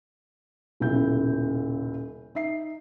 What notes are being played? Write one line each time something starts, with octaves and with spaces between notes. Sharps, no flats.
D#1 B1 C#3 E4 G6
D#4 E5 C7